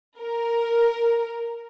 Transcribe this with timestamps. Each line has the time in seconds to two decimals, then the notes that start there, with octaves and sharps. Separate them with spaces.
0.19 A#4